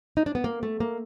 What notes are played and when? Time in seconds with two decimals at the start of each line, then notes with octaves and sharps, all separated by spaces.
0.17 D#4
0.26 D4
0.35 B3
0.44 A#3
0.63 A3
0.80 A#3